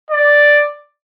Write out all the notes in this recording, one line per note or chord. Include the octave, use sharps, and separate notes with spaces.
D5